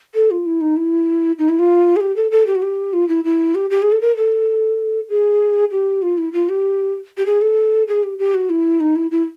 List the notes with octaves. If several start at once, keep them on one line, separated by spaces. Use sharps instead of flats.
A4
F4
E4
D#4
E4
D#4
E4
F4
G#4
G4
A4
A4
G4
F#4
G4
F4
E4
E4
G4
G4
G#4
A4
A#4
A4
G#4
G4
F4
E4
F4
G4
G4
G#4
A4
G#4
G4
G4
F#4
E4
D#4
E4
E4